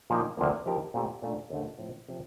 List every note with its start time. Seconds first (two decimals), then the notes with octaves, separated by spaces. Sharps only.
0.10 A#2 F3 A#3 D#4
0.37 D2 C3 F3 A#3
0.66 F3 C4 D#4 G4 A#4
0.94 A#2 A3 C4 G4
1.22 A#2 A3 D4
1.50 D#2 D3 A3
1.79 A2 F3 C4
2.08 C3 F3 C4